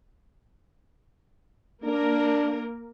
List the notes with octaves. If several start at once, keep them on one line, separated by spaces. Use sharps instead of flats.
A#3 D4 A#4